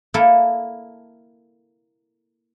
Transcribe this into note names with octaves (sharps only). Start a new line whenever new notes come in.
A#3 E4 A4